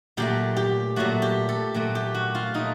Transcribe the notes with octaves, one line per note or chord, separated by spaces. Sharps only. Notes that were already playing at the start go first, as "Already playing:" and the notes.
A#2 F#3 A3 G4
G4
A#2 F#3 A3 F#4
G4
A4
A#2 F#3 A3
G4
F#4
F4
A#2 F#3 A3 D#4